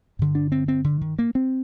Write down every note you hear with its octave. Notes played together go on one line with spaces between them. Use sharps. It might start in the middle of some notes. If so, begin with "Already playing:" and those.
G2 D3
D4
C4
C4
D3
D#3
A#3
C4